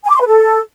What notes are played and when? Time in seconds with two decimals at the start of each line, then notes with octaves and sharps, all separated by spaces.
0.04 G#5
0.09 D6
0.15 C6
0.21 B4
0.26 A4